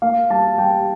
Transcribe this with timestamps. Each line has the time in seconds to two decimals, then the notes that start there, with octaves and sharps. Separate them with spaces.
0.02 A#3 F5
0.30 G3 A5
0.57 G3 G5